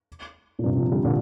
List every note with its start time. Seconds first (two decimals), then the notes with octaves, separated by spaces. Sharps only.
0.59 A#2
0.63 G2 C3
0.77 C3 F3
0.91 D3 G3
1.05 A#2 D3